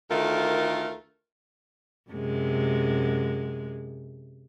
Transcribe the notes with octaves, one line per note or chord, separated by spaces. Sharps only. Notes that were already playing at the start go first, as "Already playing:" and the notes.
D2 D#3 A3 F4 A#4
F#2 C3 G#3